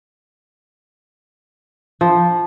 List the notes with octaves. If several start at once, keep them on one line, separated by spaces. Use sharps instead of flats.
F3